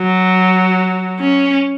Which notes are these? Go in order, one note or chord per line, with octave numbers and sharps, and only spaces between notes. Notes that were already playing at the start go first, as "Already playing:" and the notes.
Already playing: F#3
C#4